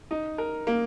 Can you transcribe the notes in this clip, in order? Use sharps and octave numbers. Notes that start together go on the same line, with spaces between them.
D#4
A#4
A#3